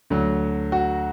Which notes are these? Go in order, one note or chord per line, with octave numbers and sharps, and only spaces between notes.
D2 D3 F#3
F#4